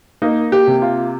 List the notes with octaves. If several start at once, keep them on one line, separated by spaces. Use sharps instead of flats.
A#3 D#4
G4
C3
F4